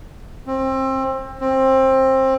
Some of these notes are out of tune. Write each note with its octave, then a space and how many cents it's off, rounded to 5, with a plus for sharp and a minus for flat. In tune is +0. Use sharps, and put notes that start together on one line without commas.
C4 +25
C4 +20